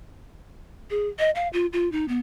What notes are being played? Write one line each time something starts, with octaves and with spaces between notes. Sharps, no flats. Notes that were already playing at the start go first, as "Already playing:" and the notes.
G#4
D#5
F5
F4
F4
D#4
B3